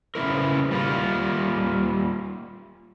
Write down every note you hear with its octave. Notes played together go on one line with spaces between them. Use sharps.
C#3 E3 G#3 E4 A#4
G3 A#3 F4